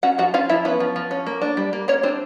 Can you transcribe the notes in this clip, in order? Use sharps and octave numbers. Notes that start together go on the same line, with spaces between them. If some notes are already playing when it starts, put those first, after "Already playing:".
C#4 F#4 F#5
F3 F#4 F#5
C#4 F4 F5
F3 E4 E5
B3 C#4 B4
F3
F3
C#4
A#3
D4
G3
A#3
A#3 C#4 C#5
C4 D4 C5